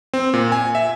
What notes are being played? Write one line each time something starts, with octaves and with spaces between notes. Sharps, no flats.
C4
A#2
G#5
E5